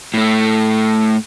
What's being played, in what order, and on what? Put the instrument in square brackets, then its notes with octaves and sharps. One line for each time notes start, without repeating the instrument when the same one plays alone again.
[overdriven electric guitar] A2 A3